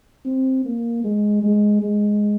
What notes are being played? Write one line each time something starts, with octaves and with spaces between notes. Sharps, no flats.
C4
A#3
G#3
G#3
G#3